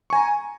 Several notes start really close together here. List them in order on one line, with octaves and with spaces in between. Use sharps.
C#6 G#5 A#5